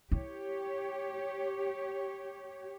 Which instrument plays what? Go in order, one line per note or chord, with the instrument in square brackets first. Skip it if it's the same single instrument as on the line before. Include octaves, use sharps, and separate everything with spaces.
[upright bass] E4 [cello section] G4 C#5